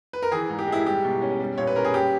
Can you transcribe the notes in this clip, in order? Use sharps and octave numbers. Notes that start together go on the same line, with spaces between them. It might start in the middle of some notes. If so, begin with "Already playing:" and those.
B4
A#4
E3 G#4
G#2
G4
G#3 E4
G3 G4
B2
C#4
G3
A#2 C#5
B4
C#4 A#4
G#4
G3 G4